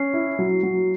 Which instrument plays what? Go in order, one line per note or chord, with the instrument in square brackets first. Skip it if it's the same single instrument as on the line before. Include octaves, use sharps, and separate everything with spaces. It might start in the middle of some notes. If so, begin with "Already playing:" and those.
Already playing: [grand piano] C#4 [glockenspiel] C7
[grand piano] E4
F#3
F#3